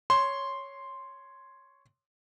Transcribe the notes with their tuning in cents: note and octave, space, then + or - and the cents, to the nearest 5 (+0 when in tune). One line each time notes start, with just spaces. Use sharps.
C#5 +0 C6 +0